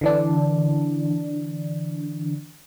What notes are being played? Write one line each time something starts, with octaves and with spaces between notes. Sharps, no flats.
D3 E3 D4